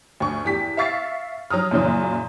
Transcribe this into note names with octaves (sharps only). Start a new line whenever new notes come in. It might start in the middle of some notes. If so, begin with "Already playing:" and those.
D2 C#6
E2 G4 B6
E5 F5 C#6 A6 C7
F#3 A#5 D#6 F6
F#2 A#2 C#3 E3 F#3